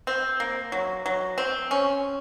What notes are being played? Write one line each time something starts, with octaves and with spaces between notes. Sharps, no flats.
C4
A#3
F#3
F#3
C4
C#4